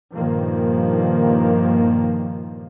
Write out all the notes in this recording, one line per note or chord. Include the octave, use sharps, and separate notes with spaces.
G2 A#2 D#3 F3 A#3